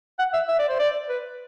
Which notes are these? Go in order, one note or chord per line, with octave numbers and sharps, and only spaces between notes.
F#5
E5
E5
D5
C5
D5
B4